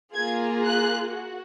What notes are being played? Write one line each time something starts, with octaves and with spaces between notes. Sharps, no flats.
A#3 F4 G#4 G#6
F#6
F#4